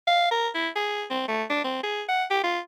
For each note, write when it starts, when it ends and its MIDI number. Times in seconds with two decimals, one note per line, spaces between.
0.07 0.30 77
0.31 0.48 70
0.54 0.69 64
0.76 1.05 68
1.10 1.25 60
1.28 1.44 57
1.50 1.60 62
1.64 1.80 60
1.83 2.04 68
2.09 2.24 78
2.30 2.39 67
2.44 2.59 65